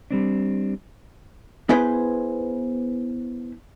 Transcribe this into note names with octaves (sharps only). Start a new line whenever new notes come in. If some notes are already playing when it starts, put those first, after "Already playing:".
G3 C4 D4
B3 E4 G#4 B4 C5